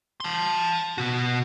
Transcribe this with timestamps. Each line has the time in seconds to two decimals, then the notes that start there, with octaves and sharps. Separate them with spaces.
0.20 A5 C6
0.98 B2 F#4